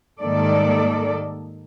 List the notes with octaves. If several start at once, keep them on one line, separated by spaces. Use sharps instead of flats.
G#2 D#3 G3 A#3 A4 D5